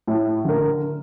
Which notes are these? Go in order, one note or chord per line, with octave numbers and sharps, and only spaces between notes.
A2
D3 A#4